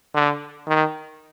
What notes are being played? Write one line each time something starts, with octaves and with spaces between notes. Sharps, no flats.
D3
D#3